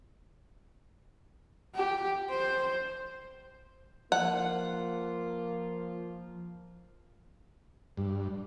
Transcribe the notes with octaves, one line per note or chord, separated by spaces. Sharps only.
G4
C5
F3 A#3 F4 F#5
G2